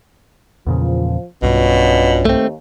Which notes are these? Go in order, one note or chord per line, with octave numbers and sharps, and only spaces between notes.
E2 A#2 C#3 F3
B1 G2 B2 C#4 D4 F4
D#2 A3 C4